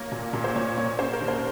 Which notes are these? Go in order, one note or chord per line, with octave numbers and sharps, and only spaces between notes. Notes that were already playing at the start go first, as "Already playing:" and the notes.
Already playing: A#3 C#5
A#2
A#2
C5
A#2 C#5
A#3 C#5
C#4 C5
A#4
D#2
C5